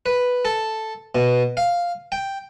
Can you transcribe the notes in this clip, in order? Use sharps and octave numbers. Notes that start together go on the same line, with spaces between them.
B4
A4
B2
F5
G5